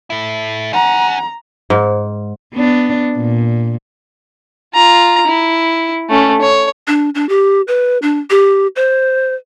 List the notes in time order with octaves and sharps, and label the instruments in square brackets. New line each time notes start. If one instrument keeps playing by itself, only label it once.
[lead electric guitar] A3 E4
[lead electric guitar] C#4 [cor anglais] F#5 [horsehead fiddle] A#5
[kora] G#2
[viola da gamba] B3 D4
A#2
[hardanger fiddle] F4 A#5
E4
A3 C#4
C#5
[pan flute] D4
D4
G4
B4
D4
G4
C5